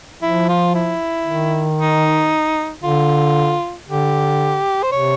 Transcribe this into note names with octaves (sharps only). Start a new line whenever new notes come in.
F3 E4
F4
E4
D#3
D#4
D3 F4
D3 G4
C5
C3 C#5